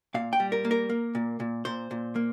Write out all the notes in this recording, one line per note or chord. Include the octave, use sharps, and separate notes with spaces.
A#2 F5
G5
G3
A#4
A#3
A#4
A#3
A#2
A#2
A#2 C5
A#2
A#3